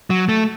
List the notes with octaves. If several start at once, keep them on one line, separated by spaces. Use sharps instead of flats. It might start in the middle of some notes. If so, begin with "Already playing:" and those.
F#3
A3